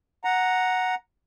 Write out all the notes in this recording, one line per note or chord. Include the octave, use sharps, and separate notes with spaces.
F#5 A#5